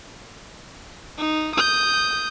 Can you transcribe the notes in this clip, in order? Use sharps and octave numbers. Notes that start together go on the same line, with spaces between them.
D#4
D#6 G6